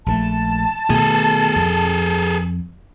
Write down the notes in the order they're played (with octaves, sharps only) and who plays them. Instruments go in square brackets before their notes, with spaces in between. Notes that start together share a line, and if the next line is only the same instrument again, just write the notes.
[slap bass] A#1 C#3 A3 [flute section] A5
[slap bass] B2 D#3 A3 [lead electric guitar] G#4 A4
[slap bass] F2